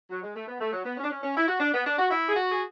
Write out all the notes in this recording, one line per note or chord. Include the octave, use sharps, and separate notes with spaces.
F#3
G#3
A3
B3
A3
F#3
B3
C#4
D4
C#4
C#4
E4
F#4
D4
B3
D4
F#4
E4
G#4
F#4
G#4